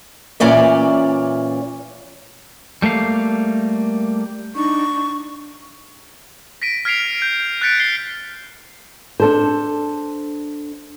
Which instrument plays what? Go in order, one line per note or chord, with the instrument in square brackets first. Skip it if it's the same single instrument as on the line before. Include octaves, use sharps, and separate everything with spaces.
[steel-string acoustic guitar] A#2 E3 C#4 D5 E5
[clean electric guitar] G3 A3 A#3 F5
[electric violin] D4 D#4 [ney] C#6
[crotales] A#6 B6 D7 D#7
F6 G#6 B6 C7 D7 F7
G6
F#6 G6 A6 B6 C#7 D7
C7 G7
[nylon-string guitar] D4 A4 C5